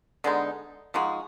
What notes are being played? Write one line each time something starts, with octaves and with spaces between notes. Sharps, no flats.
D3 G#3 B3 D#4
F3 G#3 D#4 F#4